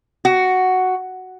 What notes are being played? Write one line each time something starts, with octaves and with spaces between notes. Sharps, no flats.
F#4